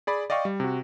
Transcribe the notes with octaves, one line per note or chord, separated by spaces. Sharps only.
G#4 D5 B5
D5 D#5 F5 G5 C#6
G3
C3 F#4